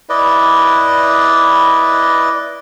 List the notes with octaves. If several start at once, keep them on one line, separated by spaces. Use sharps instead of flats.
E4 B4 D5 D#5